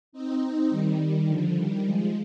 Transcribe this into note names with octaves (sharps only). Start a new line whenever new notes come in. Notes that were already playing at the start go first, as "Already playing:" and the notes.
C4 D#4
D#3 G3
D3 F3
D#3 G3
F3 G#3